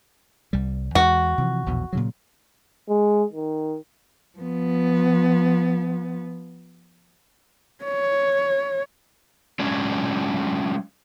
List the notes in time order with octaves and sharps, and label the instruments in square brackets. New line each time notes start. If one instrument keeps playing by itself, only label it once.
[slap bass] C2 G3
[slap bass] E2 G#3 [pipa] F#4
[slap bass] C3 E3 F3
A#1 E2 B2
A#2 C#3 F#3
[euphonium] G#3
D#3
[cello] F3 B3
[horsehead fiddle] C#5
[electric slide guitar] F#3 G#3 C#4 D4